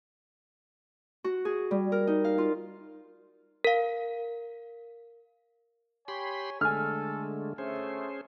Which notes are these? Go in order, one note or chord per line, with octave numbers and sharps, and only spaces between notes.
F#4
G#4
G3
A#4
D#4
F5
F4
A#4 F5
G4 C#5 G#5 B5 C6
D3 G#3 A3 A4 G#5 F6
A3 C#4 G#4 C5